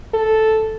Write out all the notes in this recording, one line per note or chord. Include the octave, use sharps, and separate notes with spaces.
A4